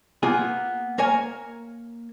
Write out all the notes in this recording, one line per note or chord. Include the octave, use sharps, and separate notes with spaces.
A#3 B3 F4 G#4 G#5
A#3 A#4 C#5 G#5